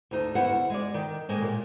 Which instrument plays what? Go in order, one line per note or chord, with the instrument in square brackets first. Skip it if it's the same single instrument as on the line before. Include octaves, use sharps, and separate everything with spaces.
[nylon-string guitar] D2 D#4 A5
D2 B3 E4 F#5
G#3 D5
D#3
A2 G#3 A#3
A#2